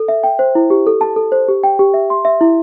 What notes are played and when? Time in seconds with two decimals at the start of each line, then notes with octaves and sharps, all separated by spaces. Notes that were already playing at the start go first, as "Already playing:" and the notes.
Already playing: A4
0.08 E5
0.23 G5
0.39 C5
0.55 E4
0.70 G4
0.87 A4
1.01 A5
1.16 A4
1.32 C5
1.48 G4
1.64 G5
1.79 G4
1.94 E5
2.10 C6
2.25 E5
2.41 E4